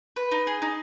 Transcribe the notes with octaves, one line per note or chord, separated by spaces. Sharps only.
B4
D#4
G#4
D#4